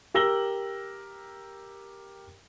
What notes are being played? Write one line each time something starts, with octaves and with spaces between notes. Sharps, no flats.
G4 A#4 E6 A#6 F#7 G7